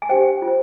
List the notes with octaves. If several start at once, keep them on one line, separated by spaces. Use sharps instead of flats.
G#5
D4 G4 C5 G5
F4
C5